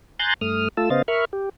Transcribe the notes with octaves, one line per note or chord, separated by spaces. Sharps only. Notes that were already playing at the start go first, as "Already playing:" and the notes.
G#5 A#5 C6 F#6 G6 A6
G2 A3 D#6 F6
A3 F4 A5 E6
C#3 B3 C5 D#5 F5 A6
A#4 E5 B5 C#6 F6
G4